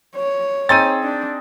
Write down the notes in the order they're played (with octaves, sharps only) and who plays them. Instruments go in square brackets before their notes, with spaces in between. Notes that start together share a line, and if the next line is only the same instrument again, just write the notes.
[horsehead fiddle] C#5
[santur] C4 D#4 G#4 [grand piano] A6 D#7
[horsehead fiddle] D4